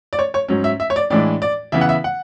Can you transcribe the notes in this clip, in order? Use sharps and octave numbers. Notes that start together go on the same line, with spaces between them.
D5
C#5
C#5
G#2 F#3 C#4
E5
E5
C#5
D5
A2 E3 G#3 D4 D5
D5
C#3 E3 B3 E5
F#5
E5
F#5